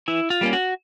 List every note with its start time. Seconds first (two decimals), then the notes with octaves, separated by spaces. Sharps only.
0.08 E3 E4
0.30 F4
0.41 G3 A#3 C#4
0.53 F#4